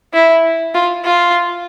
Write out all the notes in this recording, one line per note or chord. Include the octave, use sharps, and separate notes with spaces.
E4
F4
F4